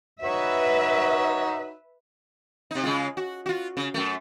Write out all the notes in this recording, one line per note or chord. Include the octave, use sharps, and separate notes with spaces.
D#4 F#4 B4 C#5 E5
C3 D#4
C#3 G#3 F4
F#4
F4 F#4
C#3
F#2 A3